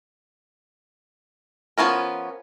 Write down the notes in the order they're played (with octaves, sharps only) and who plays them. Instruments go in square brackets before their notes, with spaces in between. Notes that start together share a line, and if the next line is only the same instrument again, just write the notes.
[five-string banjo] F3 B3 C#4 A#4